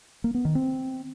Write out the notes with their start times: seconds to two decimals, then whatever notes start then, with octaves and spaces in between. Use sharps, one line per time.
0.24 A#3
0.34 B3
0.45 D#3
0.55 C4